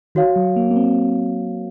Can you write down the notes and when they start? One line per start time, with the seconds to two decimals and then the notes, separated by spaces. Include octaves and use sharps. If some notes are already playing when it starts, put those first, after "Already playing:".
0.15 D#3 F#4 C#5 F5
0.36 F#3
0.56 A#3
0.71 A#3
0.76 C4